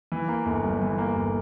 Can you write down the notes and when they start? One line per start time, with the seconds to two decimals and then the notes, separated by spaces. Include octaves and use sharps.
0.12 E3
0.28 A#3
0.46 G1
0.64 G2
0.82 E3
0.98 A#3
1.16 G1